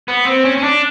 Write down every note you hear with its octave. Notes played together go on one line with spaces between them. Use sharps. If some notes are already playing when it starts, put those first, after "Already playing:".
B3
C4
C#4
C#4
D4